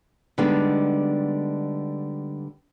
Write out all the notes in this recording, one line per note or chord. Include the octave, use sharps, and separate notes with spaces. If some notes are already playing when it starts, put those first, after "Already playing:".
D3 G3 G#3 B3 D4 D#4